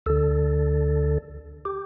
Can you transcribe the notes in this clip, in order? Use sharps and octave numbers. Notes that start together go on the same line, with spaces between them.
D2 D3 A4
G4